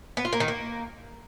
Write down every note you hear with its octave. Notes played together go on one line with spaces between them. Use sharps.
B3
F4
A#3
D#3
A#3